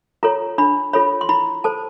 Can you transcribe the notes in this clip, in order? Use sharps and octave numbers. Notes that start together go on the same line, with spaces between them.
F4 A4 C#5 A#5
D4 B5
F4 A4 C#5 B5
C6
E4 B5
A4 C5 A5